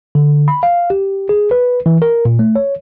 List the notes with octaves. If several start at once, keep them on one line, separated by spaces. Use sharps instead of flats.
D3
B5
F5
G4
G#4
B4
E3
A#4
A#2
A3
C#5